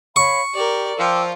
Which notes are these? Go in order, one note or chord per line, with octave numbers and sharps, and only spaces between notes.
C#5 F5 B5 C#6
G4 A#4 D5
F3 F4 G5 D6 E6